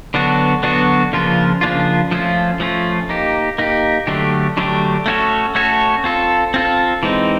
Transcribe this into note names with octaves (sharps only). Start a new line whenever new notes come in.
D3 F#3 B3 D4 F#4
D3 F#3 B3 D4 F#4
C#3 F3 A#3 D4 F4
C#3 F3 A#3 D4 F4
F3 A3 C#4 F4
F3 A3 C#4 F4
A#3 D#4 G4
A#3 D#4 G4
D3 F#3 A3 D4 G4
D3 F#3 A3 D4 G4
A3 C#4 F#4 A4 C#5
A3 C#4 F#4 A4 C#5
C4 F4 A4
C4 F4 A4
E3 G#3 C4 D#4